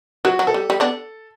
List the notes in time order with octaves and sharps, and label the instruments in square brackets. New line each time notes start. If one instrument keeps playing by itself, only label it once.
[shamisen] F#3 [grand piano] F#4
[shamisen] F#3
[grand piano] A4
[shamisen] G3
G3
B3 D4